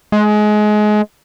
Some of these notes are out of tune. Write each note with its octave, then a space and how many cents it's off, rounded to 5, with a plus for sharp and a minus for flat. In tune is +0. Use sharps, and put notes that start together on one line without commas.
G#3 +25